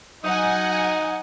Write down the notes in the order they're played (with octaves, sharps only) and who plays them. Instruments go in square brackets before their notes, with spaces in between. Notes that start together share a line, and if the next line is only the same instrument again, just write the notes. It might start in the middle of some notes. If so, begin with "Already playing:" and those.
[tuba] F#3 [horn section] D#4 [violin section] F#5 G#5